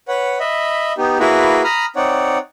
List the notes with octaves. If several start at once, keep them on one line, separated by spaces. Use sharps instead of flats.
B4 C#5 F#5
D#5 E5 B5
B3 D#4 G4
A#3 E4 F#4 G#4 B4
A#5 B5 D#6 F6
C4 D#4 C#5 D5 F#5